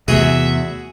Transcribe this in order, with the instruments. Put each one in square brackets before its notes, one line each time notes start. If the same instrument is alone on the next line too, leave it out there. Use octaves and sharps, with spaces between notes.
[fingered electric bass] E2 [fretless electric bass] C3 A3 [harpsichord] F#4 G#4 [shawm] E5